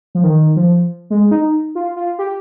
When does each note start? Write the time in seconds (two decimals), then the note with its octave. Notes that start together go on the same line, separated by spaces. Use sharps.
0.15 F3
0.24 D#3
0.56 F3
1.10 G#3
1.31 D#4
1.75 F4
1.96 F4
2.19 G4